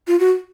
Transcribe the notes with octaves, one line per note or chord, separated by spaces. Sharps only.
F4
F#4